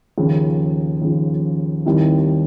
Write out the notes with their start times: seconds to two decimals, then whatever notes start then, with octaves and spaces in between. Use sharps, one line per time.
0.18 D#2 C#3 F3
1.02 D#2 C#3 F3
1.86 D#2 D#3 G3 C4 E4